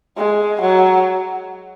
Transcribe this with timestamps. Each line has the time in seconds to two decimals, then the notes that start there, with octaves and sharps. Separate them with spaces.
0.17 G#3
0.62 F#3